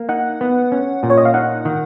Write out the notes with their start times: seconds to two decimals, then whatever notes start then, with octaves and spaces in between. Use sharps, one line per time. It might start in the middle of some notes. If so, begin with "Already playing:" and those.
Already playing: A#3
0.09 D#4 F#5
0.41 B3
0.72 C#4
1.03 A#2
1.10 C#5
1.18 D#5
1.25 F5
1.34 D#4 F#5
1.65 D#3